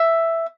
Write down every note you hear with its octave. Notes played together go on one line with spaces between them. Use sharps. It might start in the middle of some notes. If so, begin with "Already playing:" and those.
Already playing: E5